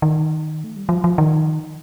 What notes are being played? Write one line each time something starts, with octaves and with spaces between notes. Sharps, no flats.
D#3
A3
G3
F3
F3
D#3